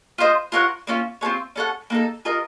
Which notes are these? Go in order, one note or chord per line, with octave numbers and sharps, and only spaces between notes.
F4 C5 D#5
F4 A#4 C#5 F#5
A#3 C#4 F4
C4 F4 A4 C#5
C#4 A4 C#5 F#5
A#3 D#4 A4
F4 A#4 D#5